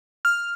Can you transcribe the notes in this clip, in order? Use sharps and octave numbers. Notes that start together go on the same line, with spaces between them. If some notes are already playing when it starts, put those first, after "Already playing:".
F6